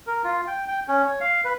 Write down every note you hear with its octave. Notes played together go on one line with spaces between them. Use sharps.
A#4
F4
G5
G5
C#4
C#5
F5
B4